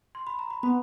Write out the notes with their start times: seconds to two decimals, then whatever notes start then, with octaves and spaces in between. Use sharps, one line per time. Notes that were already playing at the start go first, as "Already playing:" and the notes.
0.15 C6
0.27 B5
0.39 A#5
0.50 B5
0.63 B3 B5